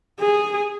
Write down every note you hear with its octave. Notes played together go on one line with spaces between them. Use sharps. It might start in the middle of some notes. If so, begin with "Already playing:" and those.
G#4